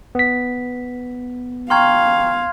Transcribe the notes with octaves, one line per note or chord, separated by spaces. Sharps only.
B3 B6
F5 G5 A#5 C6 C#6 F6 G#6